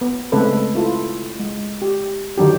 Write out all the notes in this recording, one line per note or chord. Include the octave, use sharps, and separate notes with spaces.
B3
C#3 G#3 A3 C4 A4 B4
E4 F4 A4
G#3
G4
D3 D#3 F#3 D4 G4